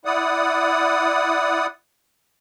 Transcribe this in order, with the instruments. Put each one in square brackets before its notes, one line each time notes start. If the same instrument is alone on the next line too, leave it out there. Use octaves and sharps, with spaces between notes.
[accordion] E4 D5 F#5 D#6